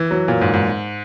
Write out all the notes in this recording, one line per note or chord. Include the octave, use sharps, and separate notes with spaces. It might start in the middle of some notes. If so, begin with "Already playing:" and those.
Already playing: E3
F#3
A#2
G#2
G#2